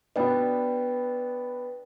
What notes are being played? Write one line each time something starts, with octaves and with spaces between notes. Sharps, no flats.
B2 B3 D4 B4 D5 G5